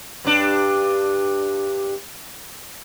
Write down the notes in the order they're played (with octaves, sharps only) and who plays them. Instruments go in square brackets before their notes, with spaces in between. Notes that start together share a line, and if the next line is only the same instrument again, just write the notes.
[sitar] G2 D4